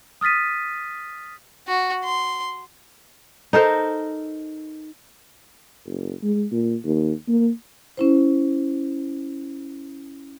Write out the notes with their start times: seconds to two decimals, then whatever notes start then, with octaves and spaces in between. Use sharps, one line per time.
0.21 D#6 F6 A6 B6 D#7
1.67 F#4
2.04 C6
3.53 D#4 A4 A#4 C5
5.86 F#1
6.23 G#3
6.52 A#2
6.84 D#2
7.28 A#3
7.97 C#4 E4 C5